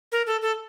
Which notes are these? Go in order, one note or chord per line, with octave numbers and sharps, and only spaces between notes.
A#4
A4
A4